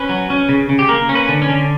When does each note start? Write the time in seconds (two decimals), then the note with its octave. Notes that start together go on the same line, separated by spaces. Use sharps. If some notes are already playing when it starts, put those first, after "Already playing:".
Already playing: C#4 B4
0.09 F#3
0.30 C#4
0.49 C#3
0.69 C#3
0.79 G4
0.89 A#3 A#4
1.09 C#4
1.15 B4
1.29 D3
1.42 C#4
1.49 D3